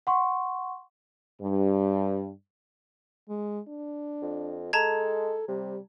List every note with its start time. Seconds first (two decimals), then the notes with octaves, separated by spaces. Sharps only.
0.07 F#5 C6 C#6
1.42 G2
3.29 G#3
3.68 D4
4.22 F2
4.73 G#3 A4 A5 A#5 G#6
5.48 C3 G3